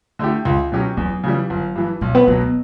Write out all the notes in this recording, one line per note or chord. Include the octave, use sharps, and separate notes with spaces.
D3 A3 E4 G4
C#2
B2 F#3 C#4 G4
E2 F#3
C#3 E3 G3
G1
G2 E3
B1 G3
B3
B2 F#3 B3
B3